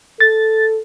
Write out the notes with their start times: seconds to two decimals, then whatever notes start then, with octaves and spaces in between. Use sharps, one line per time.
0.20 A4 A6